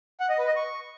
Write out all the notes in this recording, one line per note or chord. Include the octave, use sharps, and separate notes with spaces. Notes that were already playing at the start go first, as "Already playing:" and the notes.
F#5
D#5
B4
D#5
C#6